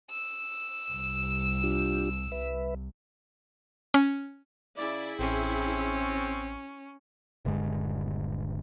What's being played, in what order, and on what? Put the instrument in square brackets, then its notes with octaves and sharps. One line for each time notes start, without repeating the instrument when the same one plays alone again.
[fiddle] E6
[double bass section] C2
[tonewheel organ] D4 F4 G4
[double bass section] C2 [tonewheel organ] B4 E5
[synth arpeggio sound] C#4
[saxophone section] C#3 D5 [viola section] E4 G#4
[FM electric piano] A1 [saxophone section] C4 [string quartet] C#4
[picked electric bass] D#1 G2 D3 G#3